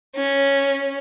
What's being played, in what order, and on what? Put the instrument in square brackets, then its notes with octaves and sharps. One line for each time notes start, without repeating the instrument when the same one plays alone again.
[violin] C#4